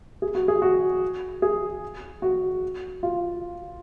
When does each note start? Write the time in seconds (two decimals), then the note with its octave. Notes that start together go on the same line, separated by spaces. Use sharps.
0.22 G#4
0.35 F#4
0.48 G#4
0.62 F#4
1.42 G#4
2.22 F#4
3.03 F4